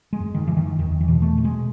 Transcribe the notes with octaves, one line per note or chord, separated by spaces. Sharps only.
G#3
F#2
D#3
D3 E3
D#3
E2 D#3
E3
B2
A3
B2
G#3